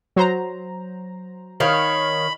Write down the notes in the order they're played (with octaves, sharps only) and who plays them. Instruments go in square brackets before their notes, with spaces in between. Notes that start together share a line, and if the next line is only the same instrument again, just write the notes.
[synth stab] F#3 C5 A#5
[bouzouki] D#3 C#5 F5 [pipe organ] B5